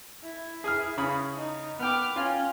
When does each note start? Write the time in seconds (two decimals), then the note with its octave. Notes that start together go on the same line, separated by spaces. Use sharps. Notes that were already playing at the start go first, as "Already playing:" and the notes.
0.24 E4
0.64 G#4 D#6 F6
0.97 C#3 B5 D#6
1.36 D#4
1.79 B3 G5 D6 F6
2.16 C#4 F4 G5